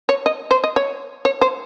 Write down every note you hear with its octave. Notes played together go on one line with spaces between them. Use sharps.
C#5
D#5
C5
D#5
C#5
C#5
C5